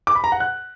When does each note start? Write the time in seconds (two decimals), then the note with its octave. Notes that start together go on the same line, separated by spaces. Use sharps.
0.07 D6
0.15 B5
0.24 A#5
0.32 F#5
0.40 F#6